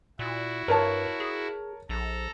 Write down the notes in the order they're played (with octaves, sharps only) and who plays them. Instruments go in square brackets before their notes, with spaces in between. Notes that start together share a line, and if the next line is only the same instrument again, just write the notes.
[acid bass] A#2 [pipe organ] E4 F#4
[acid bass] G2 [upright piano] A#4 C#5 A5
[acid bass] G#4
[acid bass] A#1 [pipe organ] A4 A#5